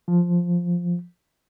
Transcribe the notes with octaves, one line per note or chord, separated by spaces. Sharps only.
F3